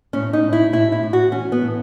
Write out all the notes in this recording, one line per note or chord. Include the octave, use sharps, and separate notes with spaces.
A2 C#4
D#4
A2
E4
A2 E4
E4
A2
F#4
E3 C#4
B3
A2